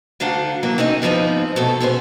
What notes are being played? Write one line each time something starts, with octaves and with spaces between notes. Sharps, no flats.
D2 D4 D#4 F5 F#5
E3 F#3 A#3
C4 C#4 D#4 D#5
G#2 F3 B3 C4 D#4
B2 A3 A4
G#3 B3 C#4 G#4 C5